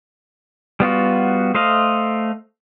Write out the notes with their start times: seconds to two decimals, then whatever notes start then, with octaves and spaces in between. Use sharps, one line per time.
0.80 G3 B3 F4 F#4
1.55 A3 C5 D#5 F5